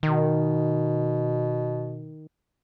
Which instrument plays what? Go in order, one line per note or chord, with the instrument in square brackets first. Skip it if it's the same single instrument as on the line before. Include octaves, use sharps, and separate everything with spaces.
[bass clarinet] B2 [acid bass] D#3